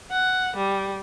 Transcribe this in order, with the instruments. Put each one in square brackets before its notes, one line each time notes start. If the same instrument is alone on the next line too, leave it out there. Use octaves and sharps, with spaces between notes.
[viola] F#5
G3